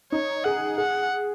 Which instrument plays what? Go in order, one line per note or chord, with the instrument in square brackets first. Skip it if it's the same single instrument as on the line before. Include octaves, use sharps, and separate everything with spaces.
[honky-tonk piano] D#4 [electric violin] C#5
[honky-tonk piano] G#4 [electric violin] F#5
[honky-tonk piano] G#4 [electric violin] F#5